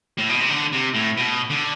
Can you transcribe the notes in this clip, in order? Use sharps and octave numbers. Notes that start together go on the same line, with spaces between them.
A2
B2
C3
D3
C3
A2
B2
D3